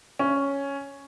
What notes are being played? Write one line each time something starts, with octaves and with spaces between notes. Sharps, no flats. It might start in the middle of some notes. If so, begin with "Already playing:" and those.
C#4